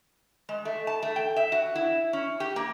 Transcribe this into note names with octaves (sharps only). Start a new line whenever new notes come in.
G#3
A3
A5
A3
G5
E5
F#4
E4
C#4
G4
A#3